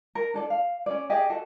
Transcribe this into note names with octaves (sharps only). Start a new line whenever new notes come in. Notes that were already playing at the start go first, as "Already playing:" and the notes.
A#4
D4 A4 D5
F5
C#4 D5
G4 G#4 D#5
F#4 A4